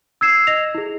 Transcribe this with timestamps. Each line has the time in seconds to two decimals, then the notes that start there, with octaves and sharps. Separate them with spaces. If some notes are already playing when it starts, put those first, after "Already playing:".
0.21 E6 G#6 C7 E7
0.47 D#5 A#6 F7
0.75 E4 G#4